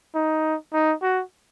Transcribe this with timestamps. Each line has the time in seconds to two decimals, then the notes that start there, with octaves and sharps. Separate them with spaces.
0.15 D#4
0.73 D#4
1.02 F#4